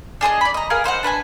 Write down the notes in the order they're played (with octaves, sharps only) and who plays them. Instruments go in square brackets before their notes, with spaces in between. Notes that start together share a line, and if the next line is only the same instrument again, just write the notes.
[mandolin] D4 G#4 C5 D#5
D5 B5
D#5 A#5
G#4 A#4 B4 F5
D#4 C5 F5 F#5
D4 B4 F#5 G#5